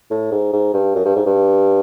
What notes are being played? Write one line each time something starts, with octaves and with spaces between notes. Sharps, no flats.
A2
G#2
G#2
G2
F#2
G2
G#2
G2